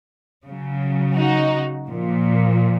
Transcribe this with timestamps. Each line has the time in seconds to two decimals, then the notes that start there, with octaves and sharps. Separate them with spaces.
0.46 C#3 F#3
1.16 D#4 F#4
1.87 A#2 F3